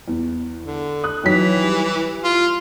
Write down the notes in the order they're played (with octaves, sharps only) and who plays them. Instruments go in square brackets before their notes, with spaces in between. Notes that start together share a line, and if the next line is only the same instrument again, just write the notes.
[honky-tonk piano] E2
[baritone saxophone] D3
[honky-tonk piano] D#6 F#6
[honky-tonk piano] D#3 F#3 B6 [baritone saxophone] E3
[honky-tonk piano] G3
[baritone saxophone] F4